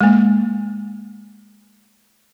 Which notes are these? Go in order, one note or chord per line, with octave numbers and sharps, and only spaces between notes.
G#3 A#3